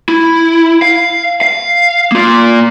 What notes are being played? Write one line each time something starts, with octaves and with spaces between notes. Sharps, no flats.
E4
F5
F5
A#3 F4